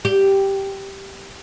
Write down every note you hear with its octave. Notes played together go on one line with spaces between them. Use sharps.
G4